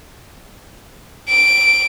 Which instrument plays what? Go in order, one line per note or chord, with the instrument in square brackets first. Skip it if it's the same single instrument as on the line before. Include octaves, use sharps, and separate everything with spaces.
[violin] D7